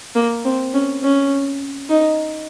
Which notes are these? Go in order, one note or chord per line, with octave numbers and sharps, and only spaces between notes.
A#3
C4
C#4
C#4
D#4